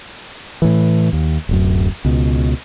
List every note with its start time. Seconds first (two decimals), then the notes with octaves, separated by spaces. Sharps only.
0.62 A2 E3
1.13 D#2
1.49 D1 F#2
2.05 C#2 B2